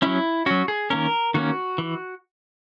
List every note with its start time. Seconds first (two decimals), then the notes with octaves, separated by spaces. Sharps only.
0.02 F#3 C#4 E4
0.46 F#3 C#4 F#4
0.68 G#4
0.90 D#3 A#3 C#4 A#4
1.34 D#3 A#3 C#4 F#4
1.78 E3